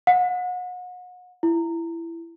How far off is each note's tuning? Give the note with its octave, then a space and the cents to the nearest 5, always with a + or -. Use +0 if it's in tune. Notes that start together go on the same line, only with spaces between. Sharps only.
F#5 -35
E4 +20